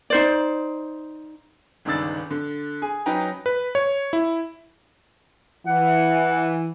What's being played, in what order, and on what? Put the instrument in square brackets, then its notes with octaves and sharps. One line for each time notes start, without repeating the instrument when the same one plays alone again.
[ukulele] D#4 C5 D5
[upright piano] G1 C#2 D#3 D4 E6 A6
D3
G#4 G#5
F#3 C#4 D#4 B4 G5 A#5
[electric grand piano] B4
C#5
E4
[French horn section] E3 [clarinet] F#5